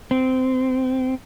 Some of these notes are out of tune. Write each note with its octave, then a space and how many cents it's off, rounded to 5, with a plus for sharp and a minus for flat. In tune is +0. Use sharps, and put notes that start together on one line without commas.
C4 -20